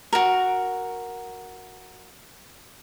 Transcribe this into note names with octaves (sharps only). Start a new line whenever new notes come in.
F#4 A#4